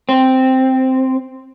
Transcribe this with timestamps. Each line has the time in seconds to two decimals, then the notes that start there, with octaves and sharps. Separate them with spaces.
0.09 C4